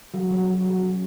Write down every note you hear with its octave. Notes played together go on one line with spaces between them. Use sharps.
F#3
F#3
F#3
F#3
C#4